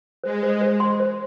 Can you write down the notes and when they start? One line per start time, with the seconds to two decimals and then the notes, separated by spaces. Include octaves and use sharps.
0.23 G#3 C5
0.43 C5
0.61 C5
0.80 C6
1.00 C5